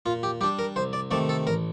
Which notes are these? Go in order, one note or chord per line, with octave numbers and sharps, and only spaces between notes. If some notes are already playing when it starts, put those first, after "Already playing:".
A#2 F4
G4
G3 D4 G4
A#4
C2 C5
D5
C3 D#3 A3 D5
A4
A1 A#4